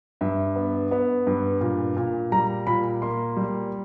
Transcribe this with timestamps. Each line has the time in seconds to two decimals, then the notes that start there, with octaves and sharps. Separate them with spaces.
0.21 G2 E5
0.56 B3
0.91 B3
1.27 G2
1.61 A#2
1.97 A#2
2.32 G3 A#5
2.67 A#2 B5
3.02 A#3 C6
3.37 G3